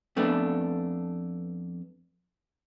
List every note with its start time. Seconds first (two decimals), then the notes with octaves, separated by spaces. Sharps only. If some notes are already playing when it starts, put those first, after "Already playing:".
0.16 F2 A3 B3 D4